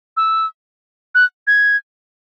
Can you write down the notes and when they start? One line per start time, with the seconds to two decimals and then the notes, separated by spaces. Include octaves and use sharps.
0.17 E6
1.15 F#6
1.47 G#6